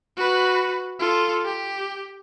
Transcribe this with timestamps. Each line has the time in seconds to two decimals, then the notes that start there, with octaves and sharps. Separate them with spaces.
0.17 F#4 B4
0.99 F4 A4
1.45 G4